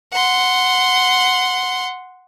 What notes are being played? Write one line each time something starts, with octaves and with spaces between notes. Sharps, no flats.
F#5 C6